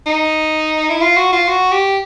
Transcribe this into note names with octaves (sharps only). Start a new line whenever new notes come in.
D#4
E4
F4
F#4
F4
F#4
G4